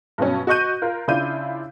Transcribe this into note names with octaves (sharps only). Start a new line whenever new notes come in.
G2 B2 F#3 C#4
F#4 D#5 C#6 F#6 G6 D#7
F4 A#4
C#3 D4 E4 F4 G6 D#7